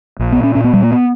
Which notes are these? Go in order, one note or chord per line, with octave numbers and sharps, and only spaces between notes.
A#1
B3
A#2
C#4
A#2 C#4
B3
A#2 G3
A#3
B3